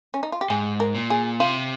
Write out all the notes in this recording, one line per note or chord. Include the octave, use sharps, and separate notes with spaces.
C#4
D#4
F4
G4
G#2 G#4
A#4
A#2
G#4
C3 F4